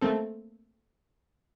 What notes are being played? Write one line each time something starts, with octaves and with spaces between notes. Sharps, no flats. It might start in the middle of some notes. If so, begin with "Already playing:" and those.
A3 A#3 C4 A4